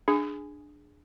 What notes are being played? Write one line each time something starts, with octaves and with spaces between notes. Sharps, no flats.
D4 G#4